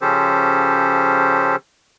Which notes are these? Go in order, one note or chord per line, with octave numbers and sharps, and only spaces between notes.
C#3 F3 C#4 G4 A4 C5